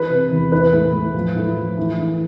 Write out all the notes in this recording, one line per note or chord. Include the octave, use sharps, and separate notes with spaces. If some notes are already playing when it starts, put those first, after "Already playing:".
Already playing: E3 B4
C3
E2
E3 B4
A2
A2
F3
A2
F3
E3
E3